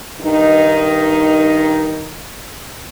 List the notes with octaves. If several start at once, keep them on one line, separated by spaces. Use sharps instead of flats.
G2 D#3 D#4